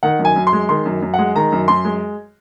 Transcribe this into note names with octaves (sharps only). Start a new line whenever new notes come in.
D#3 F#5
F#2
G#5
F#2
C6
G#3
D#3 C6
F#2
F#2
G#3 F#5
D#3 A#5
F#2
F#2 C6
G#3